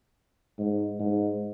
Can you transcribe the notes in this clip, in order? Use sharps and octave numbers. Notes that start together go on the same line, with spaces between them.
G#2
G#2